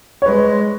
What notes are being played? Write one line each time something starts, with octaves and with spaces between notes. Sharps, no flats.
C#5
G#3 B4